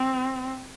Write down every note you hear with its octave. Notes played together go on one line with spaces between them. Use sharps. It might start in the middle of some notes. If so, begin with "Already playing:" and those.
Already playing: C4